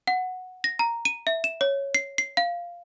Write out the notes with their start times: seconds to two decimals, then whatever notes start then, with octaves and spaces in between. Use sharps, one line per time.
0.07 F#5
0.64 A#6
0.79 A#5
1.05 D#7
1.27 E5
1.44 E7
1.61 C#5
1.95 C7
2.18 C7
2.37 F5